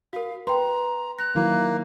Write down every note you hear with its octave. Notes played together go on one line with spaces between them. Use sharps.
F#4 A#4 F5
B4 G5 A#5 C6
F#6 A#6 F7
D#3 F#3 A#3 E4